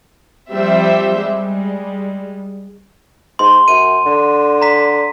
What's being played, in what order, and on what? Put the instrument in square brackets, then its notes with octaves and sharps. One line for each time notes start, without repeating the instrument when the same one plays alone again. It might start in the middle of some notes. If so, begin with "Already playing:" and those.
[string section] F3 G3 C4 G4 C5 E5
G3 G#3
[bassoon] G#2 [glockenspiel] C6
[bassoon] F#2 [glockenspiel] D#7
[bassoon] D3
[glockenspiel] A#5 B6